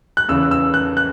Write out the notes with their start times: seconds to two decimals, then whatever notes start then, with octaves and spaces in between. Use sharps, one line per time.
0.17 F#6
0.28 E2 C#3 E3 E6
0.51 E6
0.74 F#6
0.97 F#6